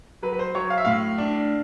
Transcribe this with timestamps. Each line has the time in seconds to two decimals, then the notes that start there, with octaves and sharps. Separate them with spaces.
0.22 F#3 B4
0.33 B4
0.39 C5
0.55 F#3 C#5
0.70 F5
0.78 E5
0.85 A2 F5
1.18 D4